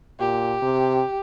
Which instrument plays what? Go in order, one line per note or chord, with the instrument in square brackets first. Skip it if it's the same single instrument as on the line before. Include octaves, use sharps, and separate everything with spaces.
[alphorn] A#2 [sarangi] G4
[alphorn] C3